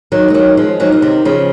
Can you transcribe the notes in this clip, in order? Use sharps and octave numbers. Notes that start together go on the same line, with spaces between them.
D#3 F#3
G#3
D#3 F#3
F3 G#3
D#3 F#3
F3
C3 D#3
C#3 F3